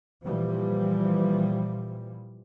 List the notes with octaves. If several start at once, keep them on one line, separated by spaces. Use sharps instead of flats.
A#2 E3 F3 G3